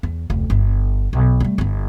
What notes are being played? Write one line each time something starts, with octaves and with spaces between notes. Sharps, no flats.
E2
F1 D2
G1
B1
G3 A3
G1 E4